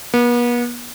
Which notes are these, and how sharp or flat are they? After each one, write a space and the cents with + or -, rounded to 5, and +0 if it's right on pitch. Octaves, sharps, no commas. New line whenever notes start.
B3 -40